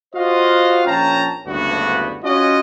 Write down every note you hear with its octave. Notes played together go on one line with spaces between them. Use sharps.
F4 F#4 C5 D#5 F5
A#1 C#4 G5 A5 A#5
F#1 D2 G2 B3 F#4
C#4 F4 F#4 D#5